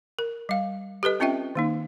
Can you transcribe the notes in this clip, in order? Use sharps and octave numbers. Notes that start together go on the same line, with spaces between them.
A#4
G3 F5
G4 A4 B4 D#5
C4 C#4 F4 D#5 E5 G5
D#3 A#3 D#4